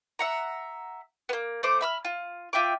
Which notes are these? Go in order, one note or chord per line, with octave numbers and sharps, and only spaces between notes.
E5 F#5 A#5
A#3 B3
A3 C5 D6
E5 B5 F6
F4
F4 E5 G5 D6